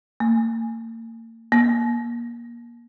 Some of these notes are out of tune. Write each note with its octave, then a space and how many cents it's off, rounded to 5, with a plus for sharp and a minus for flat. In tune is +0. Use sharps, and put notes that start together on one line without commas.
A#3 -40
A#3 +25